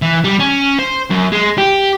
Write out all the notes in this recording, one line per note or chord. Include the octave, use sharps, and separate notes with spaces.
E3
G3
C#4
C5
F#2
G#3
G4